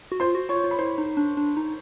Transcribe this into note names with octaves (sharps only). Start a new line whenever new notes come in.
F#4
F4 C5 C6
F#4
F4 C#5 C#6
F4
B5
E4 C5 C6
D#4
D4
D4
D#4